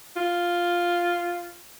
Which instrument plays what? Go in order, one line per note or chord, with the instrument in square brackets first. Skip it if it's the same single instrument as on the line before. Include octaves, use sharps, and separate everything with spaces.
[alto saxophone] F4